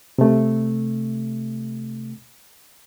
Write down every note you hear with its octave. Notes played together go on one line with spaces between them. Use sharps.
C3 A3